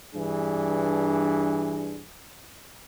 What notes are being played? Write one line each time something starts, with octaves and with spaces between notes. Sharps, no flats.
G2 E3 D4 G#4